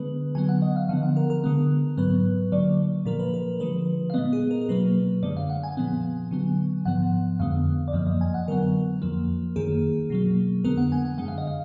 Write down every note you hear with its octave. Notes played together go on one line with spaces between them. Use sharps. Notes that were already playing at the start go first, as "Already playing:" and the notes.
Already playing: D3 G#3 B3 B4
D3 F#3 B3 G#5
F#5
D#5
F5
D3 F3 B3 F5
F#5
A#4
A#4
D3 G#3 B3
G#2 F#3 B3 B4
D3 F#3 A#3 D5
A#2 F3 A#3 A#4
B4
A#4
D3 F3 G#3 B4
F5
A#2 G#3 B3 D#5
G#4
A#4
A#4
B2 F#3 A#3 B4
F#2 D3 G#3 D5
F5
F#5
G#5
A#2 F3 G#3 B3
D3 F#3 B3
G#2 F3 B3 F#5
F2 D3 G#3 B3 F5
D5
F#2 F3 A#3 D#5
D#5
G#5
F#5
D3 F#3 B3 A#4
F2 F3 A#3
F#2 D#3 A#3 G#4
B2 F#3 A#3
F2 D3 G#3 B3 A#4
F#5
G#5
F#5
F#2 D3 G#3 F#5
F5
D#5
F5